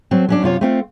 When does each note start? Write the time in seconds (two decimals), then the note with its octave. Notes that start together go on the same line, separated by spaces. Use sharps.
0.11 F#3 C4 A4
0.29 F#3 C#4 D4
0.42 F#2 C3 F4 C#5
0.61 A3 C4 F4